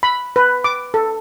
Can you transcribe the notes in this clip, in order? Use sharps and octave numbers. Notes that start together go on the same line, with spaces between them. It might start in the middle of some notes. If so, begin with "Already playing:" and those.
B5
B4
D6
A4